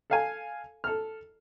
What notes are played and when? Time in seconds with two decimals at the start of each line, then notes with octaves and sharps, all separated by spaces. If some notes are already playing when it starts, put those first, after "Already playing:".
0.10 A4 F5 G#5
0.84 A4 F6